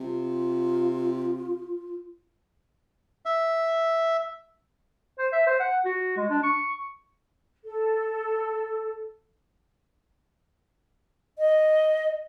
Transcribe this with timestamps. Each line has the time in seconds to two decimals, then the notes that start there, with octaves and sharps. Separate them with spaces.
0.01 C3 F4
3.26 E5
5.18 C5
5.32 E5
5.47 C5
5.59 F#5
5.85 F#4
6.17 G#3
6.30 D4
6.43 C#6
7.65 A4
11.38 D#5